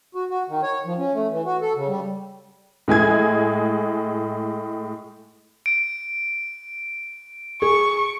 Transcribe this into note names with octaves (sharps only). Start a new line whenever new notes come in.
F#4
F#4
D#3
C#5
F3
C#4
A3
E3
F#4
A4
C#3
G3
A2 G#3 G#5 G#6
D7
G#4 C#6